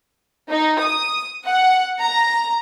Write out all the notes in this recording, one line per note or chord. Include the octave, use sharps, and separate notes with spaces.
D#4
D#6
F#5
A#5